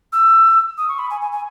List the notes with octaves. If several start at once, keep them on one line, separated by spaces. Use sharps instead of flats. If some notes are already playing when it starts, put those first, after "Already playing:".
E6
D#6
C#6
B5
G#5
G#5
G#5